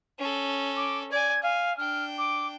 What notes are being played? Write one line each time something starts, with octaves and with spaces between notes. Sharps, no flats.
C#4 A4
D6
D5 G#5 G#6
F5 G#5
D4 G5 F6
D6